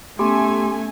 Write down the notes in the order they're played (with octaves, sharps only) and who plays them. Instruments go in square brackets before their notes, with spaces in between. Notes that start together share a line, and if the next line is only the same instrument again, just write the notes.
[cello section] A3 [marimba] B3 C#4 [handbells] G4 C6 [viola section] G#5